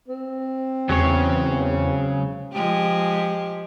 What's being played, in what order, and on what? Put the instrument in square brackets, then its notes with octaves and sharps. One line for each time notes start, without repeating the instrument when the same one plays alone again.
[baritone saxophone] C4
[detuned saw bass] E2 [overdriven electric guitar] C#3 [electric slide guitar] F#3 G#3 C#5
[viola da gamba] F3 G#3 G4